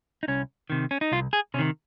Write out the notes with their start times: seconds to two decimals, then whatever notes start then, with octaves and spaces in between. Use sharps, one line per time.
0.23 D#4
0.28 C2 C#4
0.70 C3 D#3
0.91 C#4
1.01 D#4
1.12 C2 F4
1.33 G#4
1.54 C3 C#4
1.59 D#3